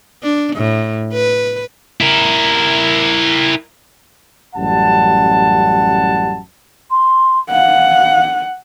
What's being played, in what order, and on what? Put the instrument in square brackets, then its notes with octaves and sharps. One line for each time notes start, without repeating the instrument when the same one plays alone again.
[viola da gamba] D4
A2
B4
[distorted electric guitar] E4 A#4
[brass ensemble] A1 F#2 G3 F#5 A5
[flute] C6
[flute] F5 [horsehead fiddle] F#5